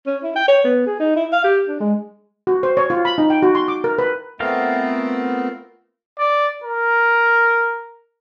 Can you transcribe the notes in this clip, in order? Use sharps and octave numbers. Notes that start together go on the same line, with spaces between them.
C#4
E4
G5
C#5
B3
G#4
D#4
E4
F5
G4
D4
G#3
F#4
C5
C#5
F4
B5
D#4
G5
F#4
C6
D6
A#4
B4
A3 B3 C4 F4 A#4 F5
D5
A#4